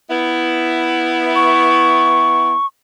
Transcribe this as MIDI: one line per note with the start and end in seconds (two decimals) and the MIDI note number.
0.10 2.54 59
0.10 2.54 64
1.35 2.66 85